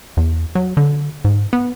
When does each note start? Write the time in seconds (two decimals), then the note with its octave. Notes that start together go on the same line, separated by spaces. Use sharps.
0.17 E2
0.55 F#3
0.77 D3
1.25 G#2
1.53 B3